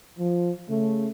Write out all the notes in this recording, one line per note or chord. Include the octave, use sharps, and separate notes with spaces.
F3
C#3 A3